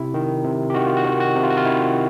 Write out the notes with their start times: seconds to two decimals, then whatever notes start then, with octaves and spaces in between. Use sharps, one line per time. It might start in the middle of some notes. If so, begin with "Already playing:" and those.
Already playing: C3 E4
0.14 D#3
0.44 C3
0.70 G4
0.74 D#3 F#4
0.87 F4
0.97 F#4
1.05 D#3
1.20 F#4
1.35 C3
1.43 F4
1.50 F#4
1.57 F4
1.65 D#3 E4